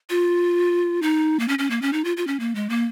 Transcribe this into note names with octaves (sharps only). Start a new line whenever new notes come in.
F4
D#4
A#3
C#4
C#4
A#3
C#4
D#4
F4
F4
C#4
A#3
G#3
A#3